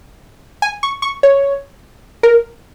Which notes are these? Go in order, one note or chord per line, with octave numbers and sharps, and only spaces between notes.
G#5
C#6
C#6
C#5
A#4